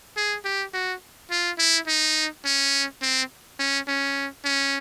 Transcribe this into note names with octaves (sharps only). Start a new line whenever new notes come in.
G#4
G4
F#4
F4
E4
D#4
C#4
C4
C#4
C#4
C#4